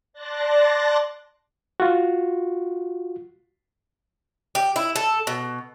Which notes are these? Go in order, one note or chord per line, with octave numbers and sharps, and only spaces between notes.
D5 A5 C6 F#6 A6 A#6
F4 F#4
G4
E4
A4
B2